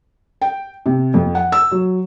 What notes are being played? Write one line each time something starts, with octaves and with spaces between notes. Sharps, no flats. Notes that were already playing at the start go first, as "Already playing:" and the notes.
G5
C3
F2
F#5
E6
F#3